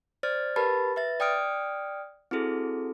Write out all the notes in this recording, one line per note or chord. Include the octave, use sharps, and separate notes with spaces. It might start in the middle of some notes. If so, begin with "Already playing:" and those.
C5 D5 F6 A6
G4 A#4 B4 A5 B5 A6
B4 E5 A6
D5 G5 D#6 F6 D7
C4 E4 F#4 G#4 A4